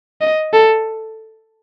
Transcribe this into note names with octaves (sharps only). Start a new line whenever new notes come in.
D#5
A4